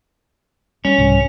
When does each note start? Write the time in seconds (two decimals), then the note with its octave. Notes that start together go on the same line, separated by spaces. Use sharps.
0.85 G3 C#4
0.98 C2 G#2 G3